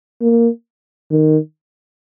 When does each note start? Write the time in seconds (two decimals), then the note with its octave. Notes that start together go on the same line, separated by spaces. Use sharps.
0.21 A#3
1.11 D#3